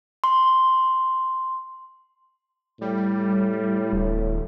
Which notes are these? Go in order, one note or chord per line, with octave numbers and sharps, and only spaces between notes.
C6
A2 G3
D1